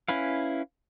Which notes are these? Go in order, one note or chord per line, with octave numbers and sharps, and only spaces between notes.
C#4 E4 B4 F5